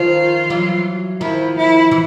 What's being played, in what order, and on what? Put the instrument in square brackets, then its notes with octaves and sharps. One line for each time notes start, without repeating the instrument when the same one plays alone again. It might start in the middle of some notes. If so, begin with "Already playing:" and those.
Already playing: [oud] D#3 F3 [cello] F4
[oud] E3 F#3
[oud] D#3 F3 [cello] E4
[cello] E4
[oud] E3